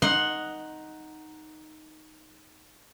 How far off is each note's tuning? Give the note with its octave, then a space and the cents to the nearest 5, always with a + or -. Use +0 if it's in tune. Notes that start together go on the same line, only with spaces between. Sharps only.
D#4 +0 F#5 +0 C6 +20